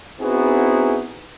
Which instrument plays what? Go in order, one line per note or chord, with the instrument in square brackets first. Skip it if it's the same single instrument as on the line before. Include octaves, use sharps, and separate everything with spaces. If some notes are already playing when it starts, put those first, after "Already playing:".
[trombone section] B3 C4 D#4 E4 F#4 G#4